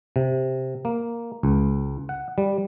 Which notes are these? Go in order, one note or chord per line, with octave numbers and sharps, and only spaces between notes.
C3
A#3
C#2
F#5
G3